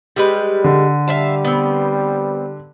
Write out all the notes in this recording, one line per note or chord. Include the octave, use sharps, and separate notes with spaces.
G3 G#3 B4
D3
G3 E5 F5 A5
B3 C4